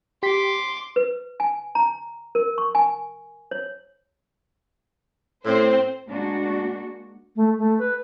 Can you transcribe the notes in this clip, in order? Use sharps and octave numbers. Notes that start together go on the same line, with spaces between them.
G4 C6 D6 B6
B4
G#5
A#5
A#4
C#6
G#5
C#5
A2 C4 C5
G#3 A#3 D4 F#4
A3
A3
B4